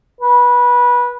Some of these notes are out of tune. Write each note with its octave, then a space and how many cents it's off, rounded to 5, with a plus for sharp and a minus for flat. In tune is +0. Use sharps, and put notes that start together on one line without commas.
B4 -20